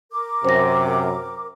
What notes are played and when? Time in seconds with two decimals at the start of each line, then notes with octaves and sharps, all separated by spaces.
0.12 A#4 D6
0.45 F#2 C3 C5 A#6